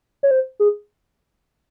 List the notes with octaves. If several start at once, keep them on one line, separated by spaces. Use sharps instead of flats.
C#5
C5
G#4